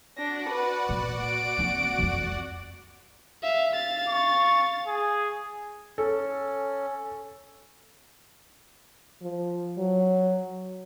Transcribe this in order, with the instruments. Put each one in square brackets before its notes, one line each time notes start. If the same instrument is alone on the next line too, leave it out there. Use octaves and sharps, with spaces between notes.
[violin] D4 A#6 [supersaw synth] F#4 D5 F#5
[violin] B4
[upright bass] A#2 A#3
[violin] D7
[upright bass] A#3 C4
F2 C4
[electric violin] E5 F5
F5 A6
[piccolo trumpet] C#6
G#4
[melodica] C#4 [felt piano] A4
[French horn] F3
F#3